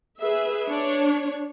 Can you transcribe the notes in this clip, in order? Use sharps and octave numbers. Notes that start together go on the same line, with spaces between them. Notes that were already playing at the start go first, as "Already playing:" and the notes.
G#4 B4 E5
D4 C#5